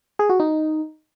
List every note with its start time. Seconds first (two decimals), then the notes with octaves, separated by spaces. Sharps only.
0.19 G#4
0.29 F#4
0.40 D#4